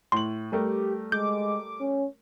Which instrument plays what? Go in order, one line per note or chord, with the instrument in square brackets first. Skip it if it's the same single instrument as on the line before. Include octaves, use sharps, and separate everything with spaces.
[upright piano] A2 F#7 [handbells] C6
[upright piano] G3 A3 A#4 [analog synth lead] G4
[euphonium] G#3 [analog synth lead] D6 [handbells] G6
[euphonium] C#4